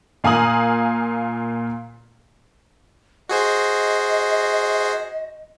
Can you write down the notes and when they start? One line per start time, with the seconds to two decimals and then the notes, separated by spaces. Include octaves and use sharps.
0.24 A#2 F5 G#5 A#5 D#6 F#7
3.29 F#4 G#4 C5 D#5